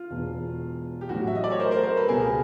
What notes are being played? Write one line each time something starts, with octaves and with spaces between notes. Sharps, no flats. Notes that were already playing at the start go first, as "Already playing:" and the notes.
Already playing: F4
E1 E2 B2
G4
A1 A2 F#3 A3 F#4
E5
D#5
D5
C#5
A#4 C5
A#4 C5
A#4 C5
A4 B4
C#2 B2 G3 G#4 A#4